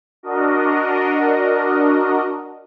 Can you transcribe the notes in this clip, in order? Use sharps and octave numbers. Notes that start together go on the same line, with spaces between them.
D4 F#4 A#4 D#5